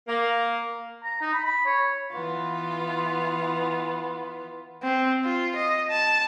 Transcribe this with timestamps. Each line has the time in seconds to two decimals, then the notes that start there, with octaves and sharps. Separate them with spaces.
0.08 A#3
1.04 A#5
1.21 D#4
1.33 B5
1.45 B5
1.66 C#5
2.11 E3 B3 F4
4.83 C4
5.24 F4
5.56 D#5
5.90 A5